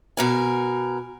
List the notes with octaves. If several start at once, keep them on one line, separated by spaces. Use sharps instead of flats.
B2 A#4 G#5